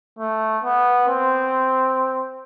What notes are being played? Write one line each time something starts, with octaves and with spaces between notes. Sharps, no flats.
A3
B3
C4